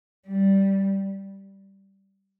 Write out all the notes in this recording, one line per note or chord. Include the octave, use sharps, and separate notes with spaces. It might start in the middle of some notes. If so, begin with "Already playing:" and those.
G3